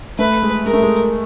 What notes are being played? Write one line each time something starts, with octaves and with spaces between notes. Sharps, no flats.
A3 B4
G#3
G#3 A#4
A3
G#3